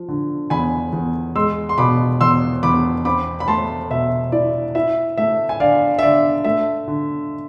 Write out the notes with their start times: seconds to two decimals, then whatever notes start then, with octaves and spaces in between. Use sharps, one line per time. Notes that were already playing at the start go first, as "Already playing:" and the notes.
Already playing: F3
0.09 D3
0.50 E2 G#5 B5
0.92 E2
1.36 G#3 C6 E6
1.69 C6
1.78 B2 B5 D6
2.21 E2 C6 E6
2.63 E2 B5 D6
3.05 C4 B5 D6
3.40 B5
3.48 A3 A5 C6
3.90 B2 E5
4.32 E4 D5
4.75 E4 E5
5.18 A3 E5
5.49 G#5
5.60 D3 D5 F5
5.99 E5
6.02 D3 D5
6.44 A3 E5
6.88 D3